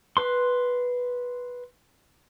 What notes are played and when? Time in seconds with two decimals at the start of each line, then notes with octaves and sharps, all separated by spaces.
0.17 B4 C6